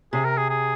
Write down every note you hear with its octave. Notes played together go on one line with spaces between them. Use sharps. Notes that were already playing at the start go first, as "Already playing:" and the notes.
C3 G#4
A#4
G#4
G#4